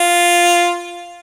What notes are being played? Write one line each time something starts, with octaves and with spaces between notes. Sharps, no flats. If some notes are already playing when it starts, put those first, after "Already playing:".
Already playing: F4